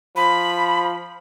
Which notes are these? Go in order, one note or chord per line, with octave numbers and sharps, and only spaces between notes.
F3 B5